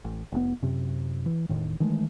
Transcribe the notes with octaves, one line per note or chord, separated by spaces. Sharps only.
A1
F1 A#2 B3
F#2 C3
E3
E1 A2 D#3
D#3 E3 G#3 A3